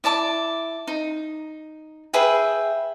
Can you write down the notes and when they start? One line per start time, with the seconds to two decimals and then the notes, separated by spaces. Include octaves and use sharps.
0.04 E4 D5 A5 D6
0.87 D#4
2.13 G#4 B4 E5 G5